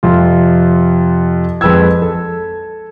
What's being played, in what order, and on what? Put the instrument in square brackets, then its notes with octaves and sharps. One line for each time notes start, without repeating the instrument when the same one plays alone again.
[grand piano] F2 C3 F4
F2 G#3 B4 G5 E6 G#6
A4